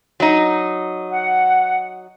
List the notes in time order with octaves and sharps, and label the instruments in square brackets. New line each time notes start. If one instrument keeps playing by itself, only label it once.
[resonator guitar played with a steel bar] F#3 D#4
[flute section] F#5